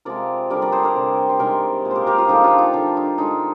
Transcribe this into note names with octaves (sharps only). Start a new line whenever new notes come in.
C3 F3 G#3 A#4 D5
D3 G3 A#4 D5
A#4 D5
G#4 C5
A#4 D5
C3 G3
C5
C3 D#3 G#3 A#4 D5
A#2 G#3
G4 A#4 C5
G4 A#4
F4 G#4
D3 F3 G#3 D#4 G4
D4 F4
D#4
D3 G3 D4
D#4
D3 G#3 D#4